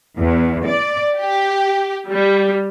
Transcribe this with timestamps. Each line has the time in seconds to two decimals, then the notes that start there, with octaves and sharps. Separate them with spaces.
0.17 E2
0.66 D5
1.18 G4
2.08 G3